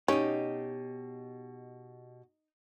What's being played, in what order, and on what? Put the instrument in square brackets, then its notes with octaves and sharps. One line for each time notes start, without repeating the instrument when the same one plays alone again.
[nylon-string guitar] B2 G4 [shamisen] C#4 [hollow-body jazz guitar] D#4